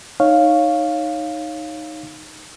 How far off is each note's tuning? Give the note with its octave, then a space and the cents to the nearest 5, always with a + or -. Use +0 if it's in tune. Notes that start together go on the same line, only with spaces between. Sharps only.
D#4 +0 C#5 +0 F5 +0